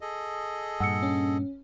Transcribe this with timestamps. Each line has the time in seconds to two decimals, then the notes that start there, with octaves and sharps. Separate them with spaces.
0.01 G#4 A4 D#5
0.80 G2 A#2 F#5 E6 C#7
1.03 C#4